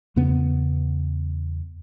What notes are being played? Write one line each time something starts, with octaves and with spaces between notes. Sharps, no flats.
E2 C#3 B3